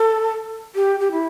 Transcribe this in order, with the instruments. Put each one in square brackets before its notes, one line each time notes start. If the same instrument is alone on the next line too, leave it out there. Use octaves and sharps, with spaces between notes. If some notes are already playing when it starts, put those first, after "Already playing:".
Already playing: [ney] A4
G4
G4
E4